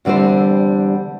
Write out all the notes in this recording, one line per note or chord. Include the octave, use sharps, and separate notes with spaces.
E2 D3 G3 C4 C5